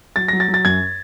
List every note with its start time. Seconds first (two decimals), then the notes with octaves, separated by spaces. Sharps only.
0.16 F#3 A6
0.28 F#3 A#6
0.40 A6
0.48 F#3
0.54 A6
0.65 F#2 G#6